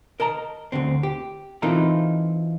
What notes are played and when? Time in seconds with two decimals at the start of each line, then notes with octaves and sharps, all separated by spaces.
0.20 A#4 D#5 A5 A#5
0.72 D2 G#2 D3 C4
1.03 G4
1.62 E3 C4 D#4 F4 A4 A#4